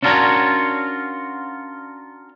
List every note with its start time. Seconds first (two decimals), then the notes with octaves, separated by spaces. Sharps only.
0.03 C#4 D4 F4 F#4 A#4 C#5